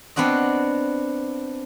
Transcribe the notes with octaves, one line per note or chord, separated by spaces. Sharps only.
B3 C4 D4 F#4 D#5